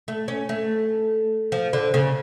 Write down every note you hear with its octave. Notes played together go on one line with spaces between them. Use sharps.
A3
C#4
A3
F3
D3
C#3